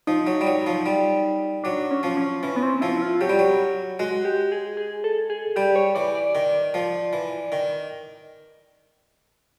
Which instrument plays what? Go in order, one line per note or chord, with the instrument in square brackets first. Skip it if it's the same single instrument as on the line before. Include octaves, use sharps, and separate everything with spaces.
[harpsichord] F3 [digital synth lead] D#4
[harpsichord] F#3
G3
F#3
F3
G3
[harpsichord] F#3 [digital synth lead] D4
[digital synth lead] C#4
[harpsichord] F3
[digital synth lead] C#4
[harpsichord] E3 [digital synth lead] C#4
[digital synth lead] B3
C4
[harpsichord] F3 [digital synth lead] E4
[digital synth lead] E4
F4
[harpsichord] F#3 [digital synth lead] G4
[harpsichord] G3
F#3
[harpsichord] G#3 [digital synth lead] F#4
[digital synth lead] G4
G#4
G#4
A4
G#4
[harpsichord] G3 [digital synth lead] G4
[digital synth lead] C#5
[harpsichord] E3 [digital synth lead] D5
[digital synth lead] D5
[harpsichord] D#3
F3
E3
D#3